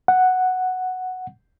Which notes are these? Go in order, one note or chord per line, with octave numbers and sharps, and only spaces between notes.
F#5